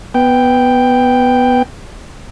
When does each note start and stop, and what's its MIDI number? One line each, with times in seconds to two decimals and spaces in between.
0.14 1.63 59
0.14 1.63 79